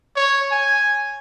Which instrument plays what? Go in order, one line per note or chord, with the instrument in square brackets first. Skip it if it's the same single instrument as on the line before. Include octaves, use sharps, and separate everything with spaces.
[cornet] C#5
G#5